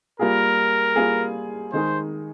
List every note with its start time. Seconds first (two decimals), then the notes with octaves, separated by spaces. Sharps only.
0.19 G3 A#3 F4 G#4 A#4
0.96 G3 A#3 F4 G#4
1.72 D#3 G#3 D#4 G#4 C5